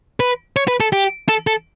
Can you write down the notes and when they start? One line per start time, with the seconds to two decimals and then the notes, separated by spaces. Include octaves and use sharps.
0.20 B4
0.56 C#5
0.68 B4
0.80 A4
0.93 G4
1.29 A4
1.47 A4